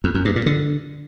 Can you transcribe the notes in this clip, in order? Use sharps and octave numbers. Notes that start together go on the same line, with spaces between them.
F2
F#2
G2
A#2
D3